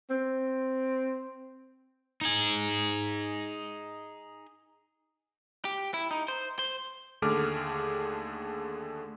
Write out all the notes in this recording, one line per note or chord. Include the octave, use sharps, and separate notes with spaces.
C4
D#4 G#4
G4
E4
D#4
C5
C5
D#2 D3 A3 G#4 D6 F6